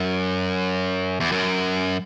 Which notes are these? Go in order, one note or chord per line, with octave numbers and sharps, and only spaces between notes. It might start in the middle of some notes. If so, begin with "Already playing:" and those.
Already playing: F#2
E2
F#2